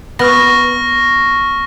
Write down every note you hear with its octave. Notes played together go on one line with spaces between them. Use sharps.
B3 C#6 F6 A#6